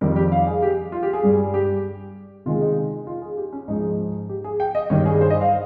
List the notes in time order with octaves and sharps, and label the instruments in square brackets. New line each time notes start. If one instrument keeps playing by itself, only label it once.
[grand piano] F2 D#3 G3 A#4
G4
F5
G#4
G4
F4
G4
G#4
G2 G3
G4
C3 D#3 G#3 F4
D#4
F4
G#4
G4
C#4
G#2 F3 G#3 D#4
G4
G#4
G5
D#5
G2 D#3 G3 C#5
G#4
C5
D#5
F5